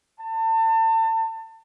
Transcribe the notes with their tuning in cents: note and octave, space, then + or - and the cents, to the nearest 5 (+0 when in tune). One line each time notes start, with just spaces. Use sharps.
A5 +35